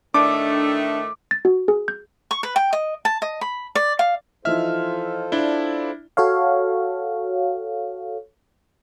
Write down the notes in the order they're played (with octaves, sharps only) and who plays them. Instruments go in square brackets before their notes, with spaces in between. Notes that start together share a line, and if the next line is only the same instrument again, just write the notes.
[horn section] A2 D#3 A3 [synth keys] D4 [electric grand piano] D6
[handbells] A6
F#4
G#4
G6
[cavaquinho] C#6
B4
G5
D#5
A5
D#5
B5
D5
F5
[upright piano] E3 F3 D#4 [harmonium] F4 A4 C5 [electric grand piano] E5 F6
[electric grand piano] D4 E4 [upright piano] D5 G7
[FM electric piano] F#4 A4 C#5 F5